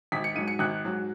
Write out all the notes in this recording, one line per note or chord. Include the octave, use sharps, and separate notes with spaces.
G#1 B6
C#7
G#2 F#3 D#7
C#7
G#1 F#6
G#2 F#3